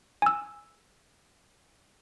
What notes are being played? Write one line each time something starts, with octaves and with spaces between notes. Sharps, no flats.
G#5 E6